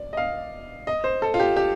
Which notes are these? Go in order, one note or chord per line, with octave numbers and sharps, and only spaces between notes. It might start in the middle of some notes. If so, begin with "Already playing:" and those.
Already playing: D5
D#5
F5
D#5
C5
A4
F4
G4
G4